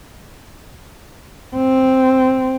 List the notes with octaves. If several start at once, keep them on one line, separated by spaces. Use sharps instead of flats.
C4